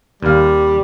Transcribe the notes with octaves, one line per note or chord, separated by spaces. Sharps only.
D#2 G3 F5